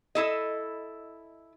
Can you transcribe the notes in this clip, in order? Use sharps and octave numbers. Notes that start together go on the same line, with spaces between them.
E4 A4 D#5